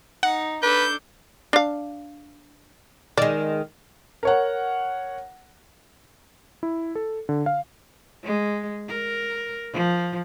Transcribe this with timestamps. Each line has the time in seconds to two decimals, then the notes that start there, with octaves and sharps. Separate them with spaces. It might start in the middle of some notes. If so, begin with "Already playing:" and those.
0.23 D#4 F#5
0.63 D4 A4 B4 G6
1.53 D4 F5
3.17 D#3 G#3 D5
4.23 A#4 C#5 F#5
6.63 E4
6.95 A4
7.29 D3
7.46 F5
8.24 G#3
8.89 A#4
9.73 F3